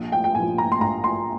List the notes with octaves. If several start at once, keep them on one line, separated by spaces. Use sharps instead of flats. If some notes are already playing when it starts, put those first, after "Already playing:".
Already playing: A#1
G5
G5
A#2 G#5
F3
A#5
C6
A#1 A#5
C6